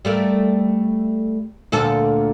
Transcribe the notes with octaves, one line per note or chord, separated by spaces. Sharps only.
G3 A3 A#4
D2 A#2 A4